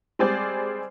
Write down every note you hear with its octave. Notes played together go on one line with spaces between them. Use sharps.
G3 G#3 C4 G#4 C5 D5